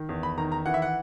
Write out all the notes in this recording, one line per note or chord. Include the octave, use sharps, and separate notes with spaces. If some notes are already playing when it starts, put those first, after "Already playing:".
Already playing: D#3
E2
B5
D#3 A#5
A#5
E3 F#5
E5
F#5